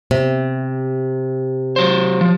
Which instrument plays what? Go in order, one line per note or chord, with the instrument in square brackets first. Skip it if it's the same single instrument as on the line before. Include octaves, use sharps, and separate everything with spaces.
[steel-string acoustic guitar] C3
[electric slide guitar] F#3 C5
F3